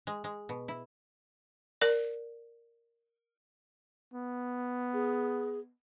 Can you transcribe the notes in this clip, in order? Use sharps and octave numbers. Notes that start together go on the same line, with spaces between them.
G#3
G#3
B2
E4
A#4 D5
B3
G#4